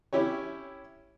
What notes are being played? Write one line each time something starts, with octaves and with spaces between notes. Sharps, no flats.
C#4 E4 G4 C#5